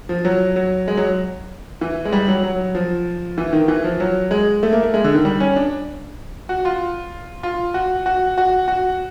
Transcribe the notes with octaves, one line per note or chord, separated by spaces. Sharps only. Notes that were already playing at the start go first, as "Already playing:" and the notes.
F3
F#3
F#3
G#3
F#3
E3
G#3
G3
F#3
F#3
F3
E3
D#3
E3
F3
F#3
G#3
A3
A#3
A3
G#3
D3
D#3
G3
C#4
D4
F#4
F4
F4
F#4
F#4
F#4
F#4